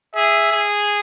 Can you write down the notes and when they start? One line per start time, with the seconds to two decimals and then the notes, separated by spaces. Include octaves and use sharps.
0.15 G#4 E5
0.52 G#4